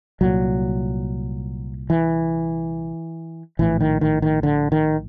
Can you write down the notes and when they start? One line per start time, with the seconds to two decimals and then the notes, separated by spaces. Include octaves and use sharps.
0.21 C2 A#2 F#3
1.90 E3
3.59 A#1 A2 E3
3.81 D#3
4.01 D#3
4.22 D#3
4.43 D3
4.72 D#3